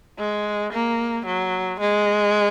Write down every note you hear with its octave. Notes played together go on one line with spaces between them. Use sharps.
G#3
A#3
F#3
G#3